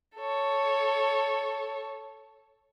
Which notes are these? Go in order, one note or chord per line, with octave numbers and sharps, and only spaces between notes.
A4 C#5